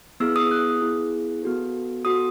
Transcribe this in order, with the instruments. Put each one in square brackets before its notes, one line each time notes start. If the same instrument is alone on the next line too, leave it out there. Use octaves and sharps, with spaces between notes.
[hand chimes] B3 E4 G#4 E6
D#6
F#6
B3 E4 G#4
B3 F#4 A4
B3 F#4 A4 D#6